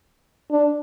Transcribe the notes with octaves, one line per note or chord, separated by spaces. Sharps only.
D4